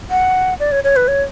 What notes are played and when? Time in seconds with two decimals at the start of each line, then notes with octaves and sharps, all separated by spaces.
0.11 F#5
0.60 D5
0.72 C#5
0.84 C#5
0.96 B4
1.08 C#5